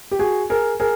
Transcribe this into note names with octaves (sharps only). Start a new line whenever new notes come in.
G4
F#4 G#4
G#4 A#4
G#4 A#4